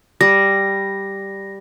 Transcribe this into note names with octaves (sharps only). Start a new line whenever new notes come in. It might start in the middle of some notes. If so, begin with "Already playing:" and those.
G3 A#6